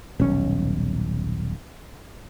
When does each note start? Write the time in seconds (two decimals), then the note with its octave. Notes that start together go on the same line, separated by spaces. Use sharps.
0.20 D#1 B1 C#4